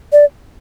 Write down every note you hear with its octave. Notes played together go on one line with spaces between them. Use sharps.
D5